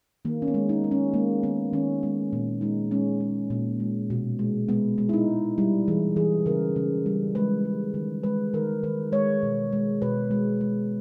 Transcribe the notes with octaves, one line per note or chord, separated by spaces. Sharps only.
D#3 A#3
C#4
B3
G#3
D#4
G#3
C#4
G#3 A#3
D#3 B3
D#3 C#4
G#3 B3
A#2
G#3 D#4
G#3 C#4
G#3
A#2
G#3
B2
G#3
G#3 B3
G#3
E4
D#4
G#3
G3 E4
E3 G#4
E3 G#4
C#3 A#4
C#3
G3
G#3 B4
G#3
D#3
G#3 B4
D#3 A#4
D#3 B4
G#3 C#5
B2
G#3
B2 B4
G#3
G#3